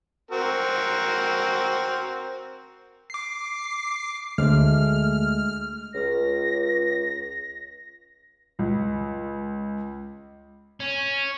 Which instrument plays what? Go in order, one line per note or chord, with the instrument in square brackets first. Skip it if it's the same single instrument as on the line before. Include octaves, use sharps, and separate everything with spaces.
[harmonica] C4 F#4 A#4
[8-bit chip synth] D6 C7
[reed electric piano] D2 [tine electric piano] G#3 A3 [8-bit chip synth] F6
[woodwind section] C#2 [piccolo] A#6
[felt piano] C#2
[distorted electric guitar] C#4